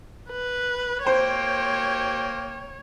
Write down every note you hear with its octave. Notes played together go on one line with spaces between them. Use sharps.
B4
A#3 C5 C#5 G5